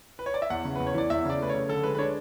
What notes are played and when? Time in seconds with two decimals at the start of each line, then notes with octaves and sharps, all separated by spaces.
0.19 B4
0.26 C#5
0.34 D5
0.42 E5
0.50 E2 F#5
0.65 C#3
0.76 E2 B4
0.87 C#5
0.94 E3 D5
1.10 E2 E5
1.25 C#3 D5
1.40 A3 B4
1.49 C#3 C#5
1.69 D3 A4
1.84 G#3 B4
1.95 B4
1.98 D4 C#5